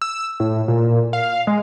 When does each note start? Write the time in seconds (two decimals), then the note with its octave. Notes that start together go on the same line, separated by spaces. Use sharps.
0.02 E6
0.40 A2
0.68 A#2
1.13 F5
1.47 G#3